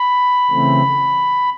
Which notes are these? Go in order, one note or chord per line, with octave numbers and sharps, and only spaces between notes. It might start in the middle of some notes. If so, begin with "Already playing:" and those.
Already playing: B5
C#3 E3 A3 C4